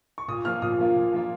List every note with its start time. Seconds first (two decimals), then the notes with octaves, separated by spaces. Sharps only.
0.18 C#6
0.28 A#2 D#6
0.45 F3 A#3 F4 F6
0.62 A#2 D#6
0.79 F3 A#3 F4
0.96 A#2
1.13 F3 A#3 F4